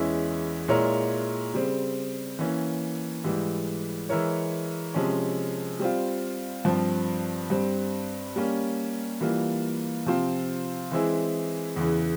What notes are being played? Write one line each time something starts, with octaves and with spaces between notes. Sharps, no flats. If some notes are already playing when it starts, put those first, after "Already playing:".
Already playing: E2 E3 G#3 C#4 E4
A#2 G#3 E4 A#4 C#5
C#3 G3 C4
E3 A#3 C#4
G#2 E3 G3
E3 G#3 E4 A#4 C#5
C3 F3 G#3 C#4
G3 C4 F4
G2 F3 C4
G2 G3 C4
G3 A#3 C#4
E3 G3 A#3 F4
C3 F3 C4 F4 C5
E3 G#3 C4 E4 G#4
E2 C#3 E3